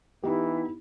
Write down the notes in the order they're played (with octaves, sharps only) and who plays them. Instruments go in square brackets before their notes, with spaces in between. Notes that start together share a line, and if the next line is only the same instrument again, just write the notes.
[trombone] E3 [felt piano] B3 D#4 [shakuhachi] E4 [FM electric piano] G4